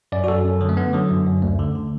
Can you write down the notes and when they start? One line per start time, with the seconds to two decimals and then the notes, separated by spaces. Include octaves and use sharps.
0.12 F#2 D5
0.24 F#4
0.28 F#2 A4
0.45 F#2
0.61 D3 F#3
0.69 A3
0.77 D3 B3
0.93 D3 F#3
1.10 F#2
1.26 F#2
1.42 D2 A3
1.59 D3
1.75 D3